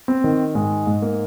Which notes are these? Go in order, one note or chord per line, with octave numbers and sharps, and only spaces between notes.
C4
D#3
G#2 G#3
G#2
A#3